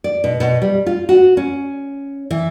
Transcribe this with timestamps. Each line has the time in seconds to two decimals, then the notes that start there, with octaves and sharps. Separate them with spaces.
0.04 D5
0.24 B2
0.40 B2
0.62 G3
0.86 F4
1.09 F#4
1.37 C#4
2.31 E3